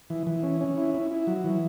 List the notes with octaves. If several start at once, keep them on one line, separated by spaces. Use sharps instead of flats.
E3
E3
C#4
C#4
E4
E4
E4
F#3
E3